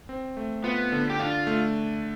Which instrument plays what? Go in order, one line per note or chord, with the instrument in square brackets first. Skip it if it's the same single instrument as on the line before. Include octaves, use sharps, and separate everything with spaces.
[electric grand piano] C4
A3
[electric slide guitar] B3 [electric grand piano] F4
[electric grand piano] D3
[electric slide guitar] G4
[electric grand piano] D4 [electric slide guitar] F4
[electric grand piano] A3